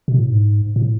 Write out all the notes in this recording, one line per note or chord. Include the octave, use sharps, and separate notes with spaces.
B2
A2
G#2
A2